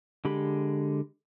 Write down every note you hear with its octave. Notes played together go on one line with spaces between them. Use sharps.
D3 G#3 G4 B5